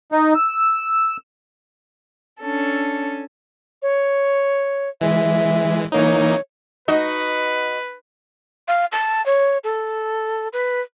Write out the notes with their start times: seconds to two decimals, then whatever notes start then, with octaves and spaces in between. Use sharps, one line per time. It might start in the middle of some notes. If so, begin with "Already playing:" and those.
0.12 D#4
0.35 E6
2.40 C#4 D4 A4
3.82 C#5
5.01 E3 G#3 E5
5.92 E3 A#3 D#4 C#5
6.88 D#4 F#4 B4 D#5
8.68 F5
8.92 A5
9.26 C#5
9.64 A4
10.53 B4